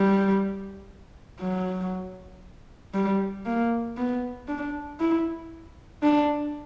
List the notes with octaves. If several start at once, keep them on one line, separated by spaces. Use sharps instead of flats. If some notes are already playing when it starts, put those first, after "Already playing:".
Already playing: G3
F#3
G3
A#3
B3
D4
E4
D4